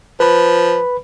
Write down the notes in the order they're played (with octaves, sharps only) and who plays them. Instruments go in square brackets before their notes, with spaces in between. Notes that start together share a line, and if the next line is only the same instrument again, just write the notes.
[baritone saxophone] F3 [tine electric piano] B4 B5